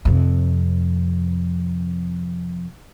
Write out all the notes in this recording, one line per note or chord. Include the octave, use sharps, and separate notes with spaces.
F2 C3